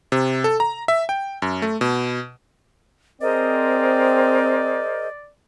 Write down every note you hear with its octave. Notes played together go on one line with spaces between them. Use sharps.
C3
A4
A#5
E5
G5
F#2
A3
B2
C4 G#4 A#4 C5 D5 D#5